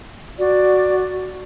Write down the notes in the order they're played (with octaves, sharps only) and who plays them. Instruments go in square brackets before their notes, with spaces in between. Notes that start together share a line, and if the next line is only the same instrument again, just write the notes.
[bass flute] F#4 [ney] D5